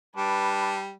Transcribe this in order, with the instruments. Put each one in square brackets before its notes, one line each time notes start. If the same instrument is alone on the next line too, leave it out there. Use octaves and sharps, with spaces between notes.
[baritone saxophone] G3 [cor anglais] D4 [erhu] B4